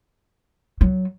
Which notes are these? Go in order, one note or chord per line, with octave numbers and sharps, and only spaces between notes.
F#3